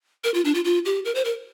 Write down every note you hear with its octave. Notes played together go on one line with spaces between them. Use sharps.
A#4
F4
D4
F4
F4
G4
A#4
C5
A#4